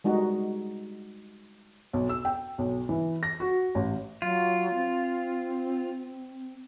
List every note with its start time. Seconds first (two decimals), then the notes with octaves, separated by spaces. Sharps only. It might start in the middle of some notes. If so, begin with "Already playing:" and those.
0.04 G3 G#3 D#4 F#4
1.93 B1
2.09 E6
2.25 G5
2.58 B1
2.89 E3
3.23 A#6
3.40 F#4
3.75 A1
4.22 F#3 F4
4.74 C4